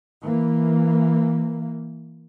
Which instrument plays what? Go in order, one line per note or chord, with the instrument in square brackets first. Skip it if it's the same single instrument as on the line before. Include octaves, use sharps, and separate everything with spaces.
[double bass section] E3 A#3